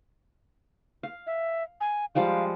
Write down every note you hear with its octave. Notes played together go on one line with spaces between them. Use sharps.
F5
E5
G#5
F3 G3 G#3 F5